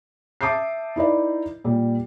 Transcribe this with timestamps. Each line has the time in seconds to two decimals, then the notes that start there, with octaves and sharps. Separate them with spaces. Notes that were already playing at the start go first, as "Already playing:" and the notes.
0.41 E5 A5 D6 D#6 G6 C7
0.96 D#4 E4 B4 D5
1.64 A#2 G3